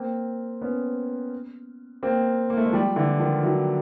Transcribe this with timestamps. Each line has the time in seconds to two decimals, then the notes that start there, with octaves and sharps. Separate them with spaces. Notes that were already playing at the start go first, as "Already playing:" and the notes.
Already playing: A#3 C4
0.61 B3 C#4
2.03 A#3 C4
2.50 A#3
2.57 A3
2.66 G#3
2.73 F3 G3
2.96 D3 E3
3.20 D#3 F3
3.43 E3 F#3